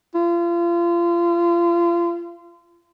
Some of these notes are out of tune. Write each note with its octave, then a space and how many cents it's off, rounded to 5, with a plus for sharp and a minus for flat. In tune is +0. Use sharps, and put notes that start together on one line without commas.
F4 -30